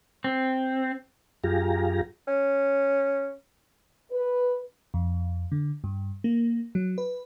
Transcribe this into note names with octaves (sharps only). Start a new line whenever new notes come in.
C4
F#2 F4 G4 G#4 A#5
C#4
B4
F2
D3
G2
A#3
F#3
B4